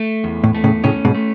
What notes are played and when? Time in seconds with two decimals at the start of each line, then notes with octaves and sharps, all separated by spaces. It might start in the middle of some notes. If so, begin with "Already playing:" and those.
Already playing: A3
0.24 E2
0.44 A2
0.55 A3
0.64 A2 C#3
0.84 A2 C#3 C#4
1.05 G#2 B2
1.15 A3